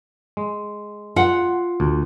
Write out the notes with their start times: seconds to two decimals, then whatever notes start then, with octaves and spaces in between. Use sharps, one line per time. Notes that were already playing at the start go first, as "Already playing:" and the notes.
0.37 G#3
1.16 F4 F#5
1.80 D2